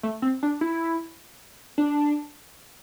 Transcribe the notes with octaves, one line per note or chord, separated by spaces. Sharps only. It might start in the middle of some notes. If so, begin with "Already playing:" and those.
A3
C4
D4
E4
D4